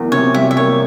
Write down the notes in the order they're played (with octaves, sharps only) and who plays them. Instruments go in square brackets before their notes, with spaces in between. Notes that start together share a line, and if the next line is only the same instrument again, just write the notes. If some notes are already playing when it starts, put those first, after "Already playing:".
Already playing: [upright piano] E2 A#3
[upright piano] C3 [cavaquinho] C#5
[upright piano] G3 [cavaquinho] E5
[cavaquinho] E5
[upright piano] A#3 [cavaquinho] C#5